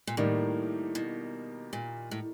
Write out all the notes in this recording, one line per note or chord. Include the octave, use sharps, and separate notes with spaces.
A#2
A2 D#3 G3 A#3 D#4
B2
A#2
A2